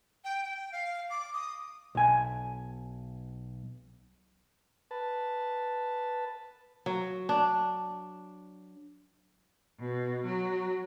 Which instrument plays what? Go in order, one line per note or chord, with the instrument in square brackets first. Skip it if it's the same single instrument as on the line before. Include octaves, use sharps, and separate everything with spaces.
[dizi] G5
G5
F5
D6
D#6
[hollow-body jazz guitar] B1 G#5
[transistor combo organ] B4 A5
[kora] F#3
D4
[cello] B2
F#3